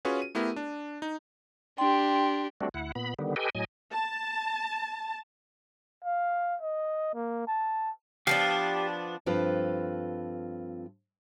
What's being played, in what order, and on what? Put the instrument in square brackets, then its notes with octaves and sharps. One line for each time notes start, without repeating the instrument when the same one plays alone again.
[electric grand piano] C#4 F4 F#4 G#4 B4 C#5
D#7
A3 B3 E4 G4 A#4
D4
D#4
[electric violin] D4 G4 [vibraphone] G5 C6
[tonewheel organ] G3 A3 C4 D4 F#4
D2 E4 F#5
A#2 B3 B5
D3 D#3 G3 B3
G4 A4 B4 D#5 G5 G#5
A2 F#3 D#5 G#5
[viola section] A5
[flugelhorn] F5
D#5
A#3
A5
[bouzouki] F3 B3 D4 [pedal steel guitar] G4 F5
[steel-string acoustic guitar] G2 F3 C4 F4 A4 B4